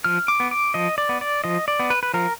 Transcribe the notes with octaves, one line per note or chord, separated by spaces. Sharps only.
F3 F6
D6
B3
D6
F3 D#5
D5
B3
D5
F3 D#5
D5
B3
B4
B4
F3 A#4